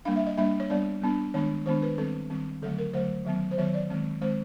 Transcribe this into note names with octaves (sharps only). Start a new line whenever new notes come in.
G3 A#3 D4 F5
E5
D#5
G3 A#3 D4 E5
C#5
G3 B3 D4 D5
G3 B3 D4
D#3 G#3 B3 D4 C#5
D#3 G#3 B3 D4 C5
B4
D#3 G3 C4 A4
D#3 G3 C4
D3 F#3 A3 A4
A#4
D3 F#3 A3 C5
D#3 F#3 B3
C5
D#3 F#3 B3 C#5
D5
D#3 G#3 C4
D#3 G#3 C4 C5